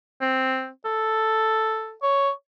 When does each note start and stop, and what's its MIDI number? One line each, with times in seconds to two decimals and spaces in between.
0.21 0.69 60
0.85 1.94 69
2.03 2.31 73